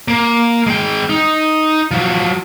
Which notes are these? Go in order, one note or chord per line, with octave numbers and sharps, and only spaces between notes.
A#3
G#3 G5
D#4
F3 F#3